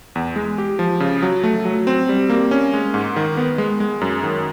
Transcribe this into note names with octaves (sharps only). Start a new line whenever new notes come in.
E2
G#3
G4
F3
C#3
F#3
A3
F#3
C4
G3
A#3
C#4
G#3
G#2
D#3
B3
G#3
G#3
F#2
D#3